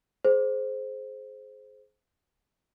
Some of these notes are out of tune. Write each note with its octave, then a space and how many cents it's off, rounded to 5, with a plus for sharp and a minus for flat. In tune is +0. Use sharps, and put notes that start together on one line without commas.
G#4 +30 C5 +0